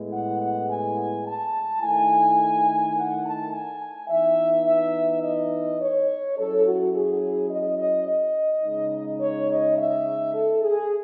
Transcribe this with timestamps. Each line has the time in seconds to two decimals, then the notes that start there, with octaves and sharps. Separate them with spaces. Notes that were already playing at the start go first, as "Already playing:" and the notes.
Already playing: A2 G#3 B3 E4
0.13 F#5
0.41 F#5
0.69 G#5
1.26 A5
1.82 D#3 A3 E4 G#5
2.96 F#5
3.25 A5
3.53 G#5
4.09 E3 B3 D#4 E5
4.66 E5
5.23 D#5
5.80 C#5
6.37 F#3 C#4 E4 A4
6.65 F#4
6.93 G#4
7.50 D#5
7.79 D#5
8.07 D#5
8.64 C#3 G#3 D#4
9.21 C#5
9.49 D#5
9.78 E5
10.34 A4
10.63 G#4